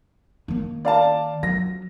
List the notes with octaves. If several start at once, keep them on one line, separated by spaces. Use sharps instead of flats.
D#3 A#3
D5 F5 A5
F#3 A#6